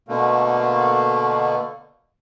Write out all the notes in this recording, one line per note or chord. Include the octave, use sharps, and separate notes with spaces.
B2 D3 A3 A#3